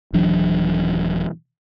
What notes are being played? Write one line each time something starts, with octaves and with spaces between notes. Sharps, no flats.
D#1 E3 F#3 D4